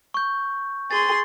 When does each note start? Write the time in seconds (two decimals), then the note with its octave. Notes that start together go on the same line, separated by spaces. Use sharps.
0.14 C#6 G6
0.91 G#4 C6 A6